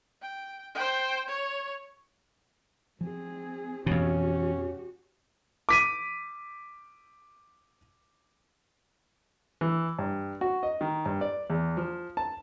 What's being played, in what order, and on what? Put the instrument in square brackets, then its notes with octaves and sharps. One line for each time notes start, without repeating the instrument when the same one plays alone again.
[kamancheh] G5
C5 G5
C#5
[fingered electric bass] F3 [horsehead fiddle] C4 G#4
[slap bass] F2 B2 [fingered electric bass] E3 [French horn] C#4 [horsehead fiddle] F#4 G4
[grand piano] D6 B6 D#7
[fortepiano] E3
G2
F#4
D#5
D#3
G2
D5
E2
F3
A5